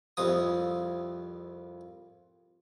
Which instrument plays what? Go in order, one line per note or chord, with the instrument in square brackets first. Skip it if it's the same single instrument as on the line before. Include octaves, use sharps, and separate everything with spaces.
[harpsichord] C2 F2 F3 D#6